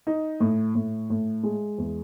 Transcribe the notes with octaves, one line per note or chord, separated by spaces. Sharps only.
D#4
A2
A2
A2
G#3
E2